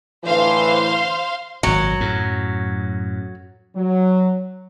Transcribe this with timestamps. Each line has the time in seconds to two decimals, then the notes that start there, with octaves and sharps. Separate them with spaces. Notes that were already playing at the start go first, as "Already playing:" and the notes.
0.25 A2 D3 E3 C5 F5 C6
1.63 G#1 A#2 F#3
2.00 F#2 A2
3.76 F#3